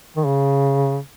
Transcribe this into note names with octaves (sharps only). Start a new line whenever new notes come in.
D#3
C#3